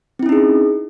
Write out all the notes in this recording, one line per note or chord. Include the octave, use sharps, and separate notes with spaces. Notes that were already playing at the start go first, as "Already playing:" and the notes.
C4 C#4 D#4 E4 G#4